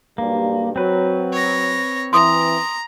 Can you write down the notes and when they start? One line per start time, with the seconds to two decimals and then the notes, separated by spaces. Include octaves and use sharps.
0.18 B1 G2 G3 A#3
0.76 F#3 C4 B4
1.33 C#5 A#6
2.13 E3 A#5 C6 D#6